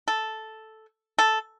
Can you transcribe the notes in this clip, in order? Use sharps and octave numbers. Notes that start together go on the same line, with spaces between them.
A4
A4